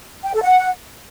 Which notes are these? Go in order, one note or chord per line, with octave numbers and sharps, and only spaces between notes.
G5
A4
F#5